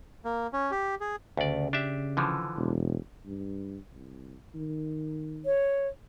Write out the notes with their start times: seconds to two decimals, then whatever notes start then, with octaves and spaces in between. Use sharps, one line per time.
0.25 A#3
0.53 C#4
0.71 G4
1.01 G#4
1.37 D2 C#3 D5
1.73 D4 G4 E5
2.17 D3 E3 F3
2.56 E1
3.26 G2
3.94 C2
4.54 D#3
5.46 C#5